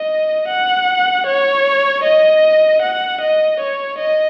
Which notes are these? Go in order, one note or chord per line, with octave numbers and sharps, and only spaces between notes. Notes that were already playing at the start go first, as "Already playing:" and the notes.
Already playing: D#5
F#5
C#5
D#5
F#5
D#5
C#5
D#5